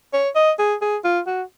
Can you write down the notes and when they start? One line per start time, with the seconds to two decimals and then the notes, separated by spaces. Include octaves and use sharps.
0.13 C#5
0.36 D#5
0.59 G#4
0.81 G#4
1.04 F4
1.26 F#4